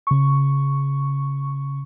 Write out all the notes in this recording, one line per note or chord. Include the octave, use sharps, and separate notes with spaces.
C#3 C#6